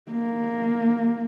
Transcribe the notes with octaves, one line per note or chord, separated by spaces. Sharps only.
A#3